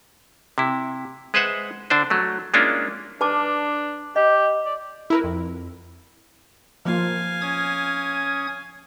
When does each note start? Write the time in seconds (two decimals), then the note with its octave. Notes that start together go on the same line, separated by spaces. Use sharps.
0.58 C3 E4
1.34 G#3 B4 C5 E5 F#5
1.90 D3 D4 C5
2.10 F#3 A3
2.54 G#3 A#3 C#4 D4 E4 F4
3.21 D4 B4 A5 D6
4.16 G4 D#5
4.65 D5
5.10 E4 A#4 B4
5.24 F2
6.85 F3 A#3 F4 F5 G#5
7.41 C#4 D#6 G#6